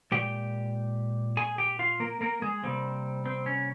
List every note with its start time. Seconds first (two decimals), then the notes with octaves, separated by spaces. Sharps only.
0.12 A#2 G#3 G4 G5
1.37 G#4 G#5
1.58 G4 G5
1.79 F4 F5
2.00 A#3 A#4
2.21 A#3 A#4
2.42 G#3 G#4
2.63 C3 G3 A#3 C4
3.26 C4
3.46 C#4